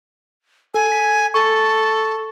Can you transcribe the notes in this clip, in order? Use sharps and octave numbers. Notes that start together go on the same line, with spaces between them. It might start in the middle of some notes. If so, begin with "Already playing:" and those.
A4 G#5
B6
A4 C#6